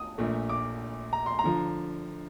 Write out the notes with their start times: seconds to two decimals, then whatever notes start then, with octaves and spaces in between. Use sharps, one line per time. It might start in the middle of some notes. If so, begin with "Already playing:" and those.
Already playing: D#6
0.18 A#1 A#2 A3
0.49 D6
1.13 A#5
1.26 C6
1.39 A#5
1.44 D3 F3